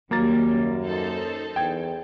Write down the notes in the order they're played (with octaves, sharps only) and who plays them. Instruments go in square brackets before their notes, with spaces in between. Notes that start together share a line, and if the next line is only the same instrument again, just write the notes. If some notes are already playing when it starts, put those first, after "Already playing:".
[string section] D#2 G3 [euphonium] F#3 [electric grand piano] A#3 A#5 A6
[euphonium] F#2
[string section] D#4 A4 C5
[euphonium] E2 [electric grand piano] G5 G#6